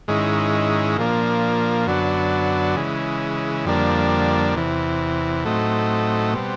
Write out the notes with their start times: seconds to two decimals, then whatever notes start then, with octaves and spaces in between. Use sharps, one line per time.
0.08 G#2 D#3 G#3 C#4 E4
0.97 A#2 F3 A#3 D4
1.86 F#2 D3 F#3 B3 D4
2.76 C#3 E3 G#3
3.65 F2 D3 G3 A#3 D4
4.55 E2 C3 E3
5.45 A2 F#3 A3 C4 D#4
6.33 B2 G3 C4